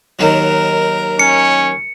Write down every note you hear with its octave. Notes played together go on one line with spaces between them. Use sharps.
D#2 D#3 F#3 A#4
C#4 C#7